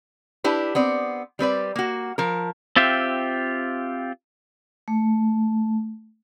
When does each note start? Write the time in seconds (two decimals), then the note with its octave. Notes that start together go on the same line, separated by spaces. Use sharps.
0.44 D4 E4 G4 B4
0.75 B3 C4 D5
1.39 G3 C4 B4 D5
1.76 A#3 F#4
2.18 F3 A#4
2.76 C4 F4 G4 E5
4.88 A3